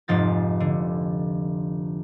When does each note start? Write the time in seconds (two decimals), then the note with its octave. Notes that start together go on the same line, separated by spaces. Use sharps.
0.08 F1 G#2 F3 A6
0.60 D3